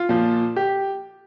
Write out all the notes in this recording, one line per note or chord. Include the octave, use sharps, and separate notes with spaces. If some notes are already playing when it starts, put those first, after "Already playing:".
Already playing: F4
A#2 F3
G4